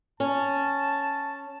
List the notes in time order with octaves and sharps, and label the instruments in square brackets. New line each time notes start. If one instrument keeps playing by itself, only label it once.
[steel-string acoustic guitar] C#4 [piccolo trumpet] A5